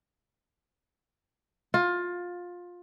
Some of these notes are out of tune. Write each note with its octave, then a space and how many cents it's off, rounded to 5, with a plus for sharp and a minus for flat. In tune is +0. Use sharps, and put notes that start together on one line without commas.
F4 +20